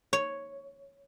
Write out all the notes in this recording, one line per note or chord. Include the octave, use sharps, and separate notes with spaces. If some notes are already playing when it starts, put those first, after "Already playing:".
C#5